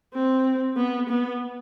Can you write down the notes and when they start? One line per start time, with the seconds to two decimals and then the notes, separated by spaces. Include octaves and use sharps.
0.14 C4
0.77 B3
1.09 B3